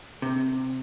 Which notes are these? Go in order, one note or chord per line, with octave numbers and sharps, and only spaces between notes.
C3